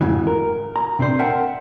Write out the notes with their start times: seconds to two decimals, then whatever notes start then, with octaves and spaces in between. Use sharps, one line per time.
0.01 F2 G#2 C#3 E3
0.27 A#4
0.76 A#5
0.99 C3 C4 D4 C5
1.19 A#4 E5 F#5 G5 A5